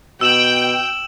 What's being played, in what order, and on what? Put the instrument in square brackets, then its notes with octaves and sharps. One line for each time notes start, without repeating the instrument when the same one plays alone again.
[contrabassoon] B2 [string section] G5 [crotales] E6 E7 F#7